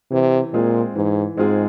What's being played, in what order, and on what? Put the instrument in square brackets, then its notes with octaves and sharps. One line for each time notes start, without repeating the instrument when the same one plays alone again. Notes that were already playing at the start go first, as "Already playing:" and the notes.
[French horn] C3 [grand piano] E3
[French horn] A#2 [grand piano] G#3 C4 F4 G#4
[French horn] G#2 [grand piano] E3
[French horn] G#2 [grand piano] G#3 C4 F4 G#4